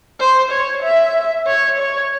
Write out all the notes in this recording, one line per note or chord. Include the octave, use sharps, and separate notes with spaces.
C5
C#5
E5
C#5
C#5